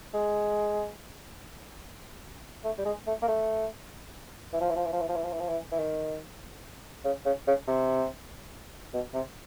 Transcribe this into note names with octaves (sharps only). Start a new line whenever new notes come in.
G#3
A3
G3
G#3
A3
A#3
A3
E3
F3
E3
F3
E3
F3
E3
F3
E3
F3
E3
F3
E3
E3
D#3
C#3
C#3
C#3
C3
B2
C3